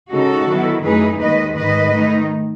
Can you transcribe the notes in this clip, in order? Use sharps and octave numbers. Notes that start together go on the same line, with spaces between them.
C#3 G#3 D#4 F#4 A4
D#3 F#3 B3 E4
F#2 E3 A3 D#4 G#4 B4
D#2 D#3 G#3 B4 D#5
G#2 D#3 G#3 B4 D#5
D#3 A3 D#4